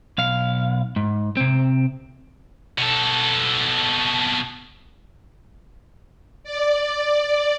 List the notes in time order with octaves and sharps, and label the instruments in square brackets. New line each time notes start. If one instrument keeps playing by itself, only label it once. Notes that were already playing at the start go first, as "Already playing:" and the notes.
[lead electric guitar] B1 F5
G#2
C3 C4
[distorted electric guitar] B2 A4
[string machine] D5